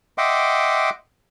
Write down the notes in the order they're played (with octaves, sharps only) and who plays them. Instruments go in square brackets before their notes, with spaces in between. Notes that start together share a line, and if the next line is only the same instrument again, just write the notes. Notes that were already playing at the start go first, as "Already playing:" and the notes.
[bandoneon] D#5 E5 F#5 G5 C6 D6